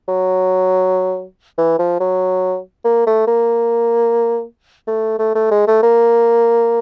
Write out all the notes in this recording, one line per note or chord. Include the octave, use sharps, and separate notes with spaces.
F#3
E3
F3
F#3
A#3
A3
A#3
A3
A3
A3
G#3
A3
A#3